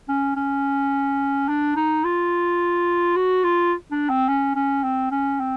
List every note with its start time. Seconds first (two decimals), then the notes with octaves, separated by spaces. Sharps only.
0.08 C#4
0.36 C#4
1.48 D4
1.76 D#4
2.04 F4
3.16 F#4
3.44 F4
3.91 D4
4.10 C4
4.28 C#4
4.56 C#4
4.84 C4
5.11 C#4
5.40 C4